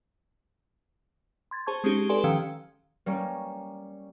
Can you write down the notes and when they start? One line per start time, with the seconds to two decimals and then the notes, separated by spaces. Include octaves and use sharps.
1.51 C6 G#6 A6
1.66 G#4 C5 A5 C#6 G#6
1.84 G#3 C4 C#4 D#4 G4 G#4
2.09 G4 A4 B4 D5 G#5 C6
2.24 D#3 F3 C#4 F5 G5 E6
3.06 G3 A#3 C#4